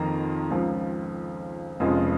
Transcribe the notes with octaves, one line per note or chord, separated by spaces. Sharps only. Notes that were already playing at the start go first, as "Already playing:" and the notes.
Already playing: F2 D#3 A#3 A#5
C#2 C#3 F3
F1 F2 C#3 F3 G#3